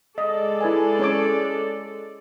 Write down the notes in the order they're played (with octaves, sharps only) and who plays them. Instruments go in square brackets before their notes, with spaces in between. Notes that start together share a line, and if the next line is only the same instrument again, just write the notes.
[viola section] G#3 A4 D5 [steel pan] D#5
[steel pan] E4 B4 G#5
C#4 C#5 D6